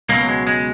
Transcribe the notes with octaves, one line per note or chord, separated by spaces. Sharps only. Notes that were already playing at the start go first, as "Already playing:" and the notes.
C#2 B2 F#3 A#3
G#3
G#3